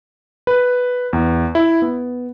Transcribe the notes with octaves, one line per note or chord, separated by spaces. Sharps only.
B4
E2
E4
B3